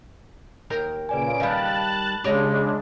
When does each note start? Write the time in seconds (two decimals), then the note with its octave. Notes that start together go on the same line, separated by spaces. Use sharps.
0.70 D#2 G4 A#4
1.09 A#2 C#3 B4 D5 G#5 D7
1.40 D#3 G3 D#5 F5 A5 B5 F#6 A6
1.80 B5
2.24 C#3 G#3 D4 G4 C#5 D#5